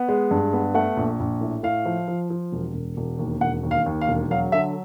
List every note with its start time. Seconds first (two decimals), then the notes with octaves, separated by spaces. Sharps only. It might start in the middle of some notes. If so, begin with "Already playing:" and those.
Already playing: B3
0.08 G#3
0.31 G2
0.53 B3
0.74 A3 F#5
0.97 A#1
1.20 A#1
1.41 A2
1.63 A2 F5
1.86 F3
2.08 F3
2.30 F3
2.52 E1
2.74 E1
2.97 E1
3.19 D#2
3.41 E1 F#5
3.63 D#2
3.71 F5
3.86 D#2
4.01 F5
4.08 E1
4.31 F#3 F5
4.52 D3 E5